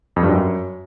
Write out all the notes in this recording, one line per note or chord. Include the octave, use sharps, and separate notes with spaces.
F2
G2
F#2